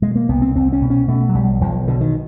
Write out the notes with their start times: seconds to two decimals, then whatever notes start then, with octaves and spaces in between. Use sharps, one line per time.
0.02 B2 G#3
0.15 A#3
0.29 C2 B3
0.42 C4
0.55 C2 C4
0.73 C#4
0.81 B2
0.90 C#4
1.08 B2 A3
1.29 F#3
1.34 B1 G3
1.61 B1 F3
1.87 B2 D3
2.01 D#3